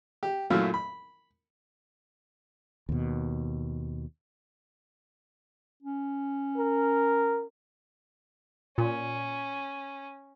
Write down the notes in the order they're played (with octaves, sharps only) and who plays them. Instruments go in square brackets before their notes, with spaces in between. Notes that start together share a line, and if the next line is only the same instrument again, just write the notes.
[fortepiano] G4
F#2 A#2 F#3 A3 E4 F4
B5
[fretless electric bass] D#2 B2
[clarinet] C#4
[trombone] A#4
[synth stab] A#2 [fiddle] C#4